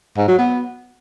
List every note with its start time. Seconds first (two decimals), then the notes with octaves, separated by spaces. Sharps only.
0.17 G#2
0.28 F#3
0.39 B3